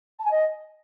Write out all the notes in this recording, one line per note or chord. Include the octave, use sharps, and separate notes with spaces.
A5
G#5
D#5